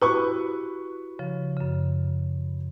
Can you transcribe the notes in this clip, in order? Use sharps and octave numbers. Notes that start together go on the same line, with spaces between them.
E4 F#4 G4 B4 C#6
C#3 F3
F#2 C#3